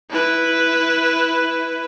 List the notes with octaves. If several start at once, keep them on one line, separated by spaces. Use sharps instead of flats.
E4 B4